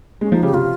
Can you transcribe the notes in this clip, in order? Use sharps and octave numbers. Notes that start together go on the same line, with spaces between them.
G#3 C#4
F3 D#4
C#3 G4
C3 F4